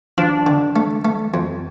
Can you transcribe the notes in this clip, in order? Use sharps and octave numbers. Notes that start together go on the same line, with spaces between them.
F3 D4
D3
A3
A3
F2